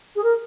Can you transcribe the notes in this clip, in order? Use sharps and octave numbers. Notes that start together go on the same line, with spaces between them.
G#4
A#4